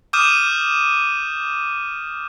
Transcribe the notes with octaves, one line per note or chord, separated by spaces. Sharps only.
D6 D#6 F6 G6 D#7 E7